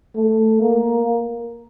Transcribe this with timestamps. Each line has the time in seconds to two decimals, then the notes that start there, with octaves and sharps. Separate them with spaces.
0.16 A3
0.61 A#3